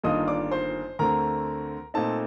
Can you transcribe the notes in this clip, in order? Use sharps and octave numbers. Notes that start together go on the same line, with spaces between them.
G1 G2 D#3 A#3 F4 D#5 D#6
D5 D6
C5 C6
D2 D3 A3 C4 A#4 A#5
A#2 A3 C4 D#4 A4 A5